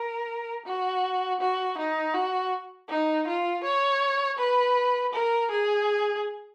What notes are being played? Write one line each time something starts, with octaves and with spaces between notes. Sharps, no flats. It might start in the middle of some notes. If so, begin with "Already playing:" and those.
Already playing: A#4
F#4
F#4
D#4
F#4
D#4
F4
C#5
B4
A#4
G#4